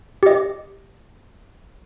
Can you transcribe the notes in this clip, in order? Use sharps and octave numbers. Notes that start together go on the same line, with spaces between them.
G4 D#5